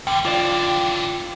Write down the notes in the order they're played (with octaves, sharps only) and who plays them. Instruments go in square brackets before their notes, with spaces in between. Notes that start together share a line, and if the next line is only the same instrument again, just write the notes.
[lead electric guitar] F2 D3 [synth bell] G5
[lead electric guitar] D3 E3 [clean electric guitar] F4 C5 D5